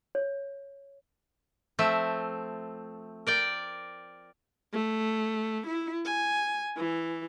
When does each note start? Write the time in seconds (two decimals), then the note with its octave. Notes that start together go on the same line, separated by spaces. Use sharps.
0.15 C#5
1.79 F3 A3 C4 E5
3.27 A#4 D5 G5
4.73 A3
5.67 E4
6.05 G#5
6.77 E3